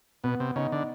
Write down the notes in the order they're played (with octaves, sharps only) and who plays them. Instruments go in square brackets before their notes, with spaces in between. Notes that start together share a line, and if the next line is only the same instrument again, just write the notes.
[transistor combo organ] B2 [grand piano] B3
[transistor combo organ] C3
[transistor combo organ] C#3 [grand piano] D#4
[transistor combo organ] D3